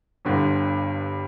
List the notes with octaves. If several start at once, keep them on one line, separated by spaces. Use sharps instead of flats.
G1 G2 D3